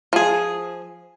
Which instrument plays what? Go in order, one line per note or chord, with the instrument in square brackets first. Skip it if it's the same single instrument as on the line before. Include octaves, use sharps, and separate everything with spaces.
[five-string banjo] F3 G#4